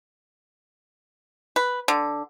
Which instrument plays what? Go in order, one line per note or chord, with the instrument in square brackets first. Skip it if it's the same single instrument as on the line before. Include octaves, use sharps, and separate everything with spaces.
[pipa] B4
D3